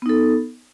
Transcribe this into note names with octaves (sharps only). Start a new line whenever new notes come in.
B3 D#4 A4